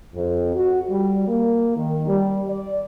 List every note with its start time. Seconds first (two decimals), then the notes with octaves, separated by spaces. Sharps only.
0.14 F2
0.55 F#4
0.90 G3
1.28 A#3
1.76 D#3
2.06 G3
2.48 D5